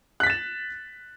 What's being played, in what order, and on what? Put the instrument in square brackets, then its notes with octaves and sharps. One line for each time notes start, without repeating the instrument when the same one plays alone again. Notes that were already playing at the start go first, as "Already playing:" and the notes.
[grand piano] F#6
B6
A6
E7